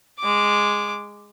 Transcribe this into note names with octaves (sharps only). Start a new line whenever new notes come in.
G#3 D6